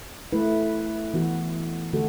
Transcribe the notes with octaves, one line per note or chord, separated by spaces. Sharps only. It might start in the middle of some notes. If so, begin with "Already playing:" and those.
A3 E4 B4
E3 B3 F#4
D3 A3 F#4 A4